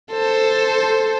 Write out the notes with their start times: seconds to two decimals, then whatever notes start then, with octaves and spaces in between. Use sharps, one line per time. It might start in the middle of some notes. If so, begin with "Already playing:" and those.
0.11 A4 C5